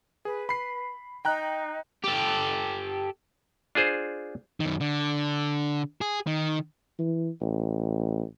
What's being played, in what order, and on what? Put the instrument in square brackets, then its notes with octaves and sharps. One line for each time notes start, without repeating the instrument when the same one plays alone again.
[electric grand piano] G#4 [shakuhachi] B4
[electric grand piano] B5 C7
[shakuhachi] D#4 [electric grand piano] G5 A#5 F#6
[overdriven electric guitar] G4 A4
[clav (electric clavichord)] D4 F4 G#4 C5
[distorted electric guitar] F#2 D#3
D3
G#4
D#3
[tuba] E3
A1